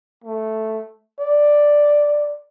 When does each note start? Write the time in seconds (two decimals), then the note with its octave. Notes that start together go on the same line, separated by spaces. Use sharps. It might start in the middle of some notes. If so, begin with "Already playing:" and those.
0.24 A3
1.20 D5